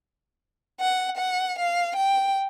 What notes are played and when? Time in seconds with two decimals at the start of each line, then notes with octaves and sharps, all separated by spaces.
0.80 F#5
1.17 F#5
1.58 F5
1.96 G5